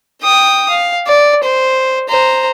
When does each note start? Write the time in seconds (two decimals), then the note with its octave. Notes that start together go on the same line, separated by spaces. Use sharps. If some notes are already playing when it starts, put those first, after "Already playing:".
0.22 G5 D#6
0.69 F5
1.07 D5
1.43 C5
2.09 C5 A#5